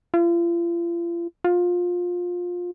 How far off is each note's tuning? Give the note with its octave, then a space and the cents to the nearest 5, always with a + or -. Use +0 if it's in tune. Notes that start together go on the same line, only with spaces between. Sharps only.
F4 -40
F4 +20